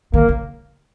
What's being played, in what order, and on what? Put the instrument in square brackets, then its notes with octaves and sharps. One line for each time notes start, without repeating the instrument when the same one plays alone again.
[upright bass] D#3 [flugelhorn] A#3
[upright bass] C#3